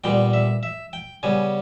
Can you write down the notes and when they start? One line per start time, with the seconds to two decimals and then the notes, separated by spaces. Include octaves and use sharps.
0.04 A#2 G3 B3 G5
0.33 E5
0.63 E5
0.93 G5
1.23 C#3 G3 B3 G#5